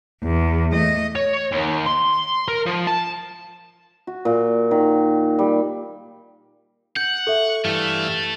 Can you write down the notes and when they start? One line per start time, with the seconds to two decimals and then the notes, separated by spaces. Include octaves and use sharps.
0.23 E2
0.73 A3 D#5
1.15 C#5
1.52 D#2
1.86 C6
2.48 A#4
2.66 F3
2.87 A5
4.07 F#4
4.25 A#2
4.71 D#3
5.39 G3
6.96 F#5 G6
7.27 A4 E5 C#6
7.65 G2 E3 A3 F5